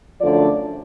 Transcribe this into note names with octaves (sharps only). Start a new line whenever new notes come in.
F#2 D3 F3 A3 D5